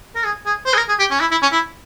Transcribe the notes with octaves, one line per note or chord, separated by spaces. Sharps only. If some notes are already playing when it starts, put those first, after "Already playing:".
A#4
G#4
G#4
C5
G#4
A#4
G#4
G4
C#4
E4
E4
C#4
E4